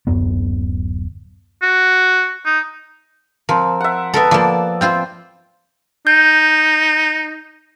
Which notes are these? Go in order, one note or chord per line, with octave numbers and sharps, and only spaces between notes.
D1 F#2 F#3 B3
F#4
D#4
F3 C4 A#4
E5 F#5
B3 A4 A#4 E5 A5 E6
F3 A#3 D5
C4 F4 C5 E5 G5
D#4 G6